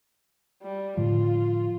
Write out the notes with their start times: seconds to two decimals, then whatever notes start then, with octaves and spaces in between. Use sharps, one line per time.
0.63 G3
0.97 A2 D3 F3 F4